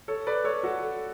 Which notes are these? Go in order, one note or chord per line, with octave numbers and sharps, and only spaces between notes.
A4 C#5
B4 D5
A4 C#5
F#4 A4